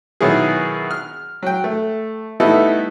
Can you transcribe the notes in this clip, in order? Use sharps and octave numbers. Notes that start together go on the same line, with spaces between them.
B2 D#3 F#3 E4 G#4
F6
F#3 G5
A3
G3 A3 B3 D#4 E4 A4